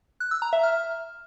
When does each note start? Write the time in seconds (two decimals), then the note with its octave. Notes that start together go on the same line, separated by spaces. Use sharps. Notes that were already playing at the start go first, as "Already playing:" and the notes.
0.20 F#6
0.31 E6
0.42 A#5
0.53 E5
0.63 F6